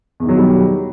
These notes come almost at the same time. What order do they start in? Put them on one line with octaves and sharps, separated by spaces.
E2 D#3 F#3 B2 G3